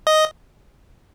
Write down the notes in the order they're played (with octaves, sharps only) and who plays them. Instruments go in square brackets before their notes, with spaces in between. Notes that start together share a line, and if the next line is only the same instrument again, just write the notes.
[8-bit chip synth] D#5